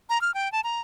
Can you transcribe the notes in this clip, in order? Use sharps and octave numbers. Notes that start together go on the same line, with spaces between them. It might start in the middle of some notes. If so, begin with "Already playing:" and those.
A#5
F6
G5
A5
A#5